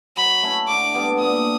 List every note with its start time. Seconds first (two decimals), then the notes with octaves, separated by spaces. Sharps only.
0.17 F#3 B5
0.43 A3 C#4 E4
0.68 D3 D6
0.94 G3 B3 D4
1.19 A#2 D#6